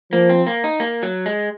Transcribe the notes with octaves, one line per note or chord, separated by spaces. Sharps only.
F3 A#3
C4
A#3
D#4
A#3
F#3
G#3